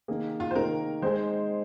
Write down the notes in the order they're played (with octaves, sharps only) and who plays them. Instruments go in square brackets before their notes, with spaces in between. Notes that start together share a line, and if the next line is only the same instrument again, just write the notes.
[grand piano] C3 D#3 A#3 G#4
[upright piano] F4
C5
[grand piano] C3 D#3 A#3 G#4 [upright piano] A#4
[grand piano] G#3 C4 D#4 G#4 [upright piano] C5